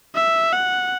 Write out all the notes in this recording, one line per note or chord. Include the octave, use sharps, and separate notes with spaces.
E5
F#5